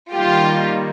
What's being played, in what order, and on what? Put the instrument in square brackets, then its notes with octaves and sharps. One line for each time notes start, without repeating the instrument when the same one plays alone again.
[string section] D#3 G3 A#3 F4 G4